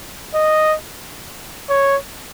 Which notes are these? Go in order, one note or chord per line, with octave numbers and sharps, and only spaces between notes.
D#5
C#5